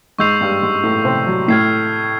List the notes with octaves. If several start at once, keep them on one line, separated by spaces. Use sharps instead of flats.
G#2 G#3 C#6 E6 G6 C7 F7
G2 G3
G#2 G#3
A2 A3
C3 C4
F#3
A2 A3 F6 G#6 C7